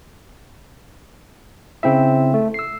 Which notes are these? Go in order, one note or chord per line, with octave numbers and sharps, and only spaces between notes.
C#3 C4 E4 E5
A3
E6 C7